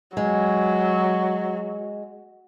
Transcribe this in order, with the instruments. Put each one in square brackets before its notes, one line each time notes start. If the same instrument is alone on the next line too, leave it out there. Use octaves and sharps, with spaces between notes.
[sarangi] F#3 [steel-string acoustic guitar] G#3